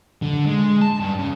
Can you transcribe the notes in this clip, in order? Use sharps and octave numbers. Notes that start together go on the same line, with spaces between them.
D3
G#3
A5
G2
C#3